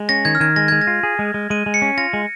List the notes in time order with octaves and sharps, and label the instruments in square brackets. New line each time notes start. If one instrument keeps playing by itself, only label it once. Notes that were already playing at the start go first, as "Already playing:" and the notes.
Already playing: [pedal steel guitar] G#3
[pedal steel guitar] C#4 [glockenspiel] A#6
[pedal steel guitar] D#3 [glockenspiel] G#6
[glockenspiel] F6
[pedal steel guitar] D#3 [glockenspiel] G#6
[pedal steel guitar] G#3 [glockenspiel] A#6
[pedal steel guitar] G#3 [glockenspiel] G#6
[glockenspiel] A#6
[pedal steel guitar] F4
G#4
G#3
G#3
[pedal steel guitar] G#3 [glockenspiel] D#7
[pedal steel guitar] G#3
[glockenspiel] C#7
[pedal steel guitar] C#4
[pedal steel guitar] F4 [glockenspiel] A#6
[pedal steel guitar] G#3